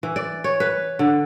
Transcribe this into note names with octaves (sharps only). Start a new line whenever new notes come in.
E3
D5
C#5
B4
D3